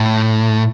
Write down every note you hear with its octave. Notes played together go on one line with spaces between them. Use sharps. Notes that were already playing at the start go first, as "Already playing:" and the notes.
Already playing: A2